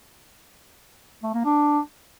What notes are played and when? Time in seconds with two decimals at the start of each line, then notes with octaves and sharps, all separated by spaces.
1.23 A3
1.34 A#3
1.45 D4